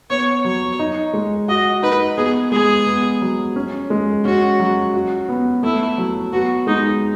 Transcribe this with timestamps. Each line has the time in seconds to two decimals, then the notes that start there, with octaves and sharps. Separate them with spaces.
0.10 B3 C#5
0.45 F#3 C#5
0.79 D#4
1.13 G#3
1.48 F#4 D#5
1.83 D#4 B4
2.17 B3 G#4
2.52 G#3 G#4
2.86 B3
3.21 F#3
3.56 C#4
3.90 G#3
4.25 C#4 F#4
4.60 F#3
4.94 F#4
5.29 B3
5.63 A3 E4
5.98 F#3
6.33 B3 F#4
6.67 G#3 D#4